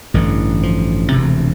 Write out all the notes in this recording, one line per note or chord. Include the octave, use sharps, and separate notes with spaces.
A1 G2 D3 E3
F3
E1 D2 C3